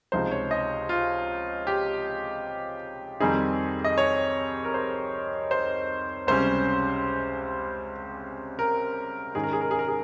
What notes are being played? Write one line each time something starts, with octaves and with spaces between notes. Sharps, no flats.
C#2 C3 F3 G#3 D#4 C5
C#5
D#5
F4
G4
F2 D#3 G3 C4 D#4 G#4
D#5
C#5
A#4
C5
C5
C#2 C3 G3 C#4 C5
A#4
G#2 D#3 G#3 C#4 G#4
A#4
G#4
A#4
G#4
A#4
G#4